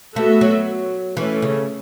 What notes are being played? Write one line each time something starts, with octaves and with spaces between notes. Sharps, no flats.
A3 B3 F#4 A4 E5
F#3
E3 A3 C#4 A4
C#3